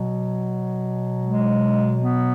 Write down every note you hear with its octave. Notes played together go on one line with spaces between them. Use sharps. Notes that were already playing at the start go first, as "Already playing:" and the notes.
Already playing: B2 F#3
G#3
B3